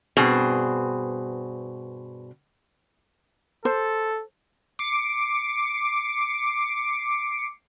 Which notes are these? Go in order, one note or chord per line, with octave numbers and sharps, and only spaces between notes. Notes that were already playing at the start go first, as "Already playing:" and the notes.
G2 B2 C4 G#4
A4 C5
D6 C7 C#7